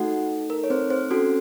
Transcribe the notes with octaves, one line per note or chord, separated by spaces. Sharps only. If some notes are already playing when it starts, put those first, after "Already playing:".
Already playing: A3 D#4 F#4 A4 F#5
A#4
C#5
C4 C5
C4 C5
C#4 F#4 A4